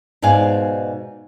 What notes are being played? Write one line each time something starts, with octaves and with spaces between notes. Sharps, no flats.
G#2 B2 D5 F5 G#5